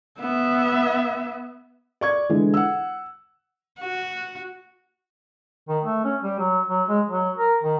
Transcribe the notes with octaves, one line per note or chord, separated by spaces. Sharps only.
B3 E5
D5 C#6 G#6
D3 E3 G#3
F#5 E6
F#4
D#3
A3
C#4
G3
F#3
F#3
G#3
F#3
A#4
D#3